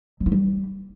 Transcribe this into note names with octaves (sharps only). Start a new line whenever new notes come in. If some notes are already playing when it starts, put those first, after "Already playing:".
F#3
E4
G3